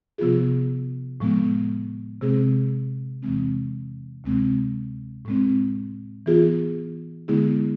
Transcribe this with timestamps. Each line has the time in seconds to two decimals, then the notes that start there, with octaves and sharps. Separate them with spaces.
0.18 C3 F3 B3 F4 G#4
1.20 A2 F3 G#3 B3
2.21 C3 G#3 C4 G#4
3.22 E2 C3 E3 G#3 C4
4.24 D2 C3 G#3 C4
5.25 A2 G#3 C4
6.26 E3 B3 F4 G#4
7.28 D3 G#3 B3 E4 G#4